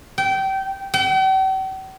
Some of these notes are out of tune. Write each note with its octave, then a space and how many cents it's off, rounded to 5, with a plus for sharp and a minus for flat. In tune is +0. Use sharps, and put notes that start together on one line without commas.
G5 -25
G5 -45